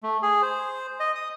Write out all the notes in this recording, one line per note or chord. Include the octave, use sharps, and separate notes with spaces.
A3
G#4
C5
D#5
D#6